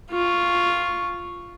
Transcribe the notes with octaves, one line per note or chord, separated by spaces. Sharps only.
F4 C#6